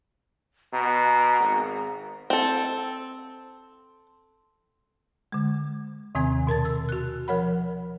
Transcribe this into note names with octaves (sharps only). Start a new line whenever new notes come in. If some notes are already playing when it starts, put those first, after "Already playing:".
B2 A#5
G#1
C4 A4
D3 G#3
D#2 C3 D#3 C4 G#5 G#6
B2 A#4 A5 A6
E6
F#4 F#6
F3 A#4 C#5 F#5 B5